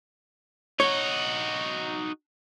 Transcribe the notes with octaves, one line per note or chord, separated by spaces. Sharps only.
D#4 F#4 C#5